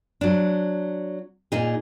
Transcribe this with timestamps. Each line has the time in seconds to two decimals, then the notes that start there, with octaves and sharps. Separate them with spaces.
0.21 F#3 D4
1.52 A#2 D#4 G#4